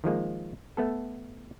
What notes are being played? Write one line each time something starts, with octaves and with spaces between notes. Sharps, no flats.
D#3 F3 G#3 A#3
A3 B3 A4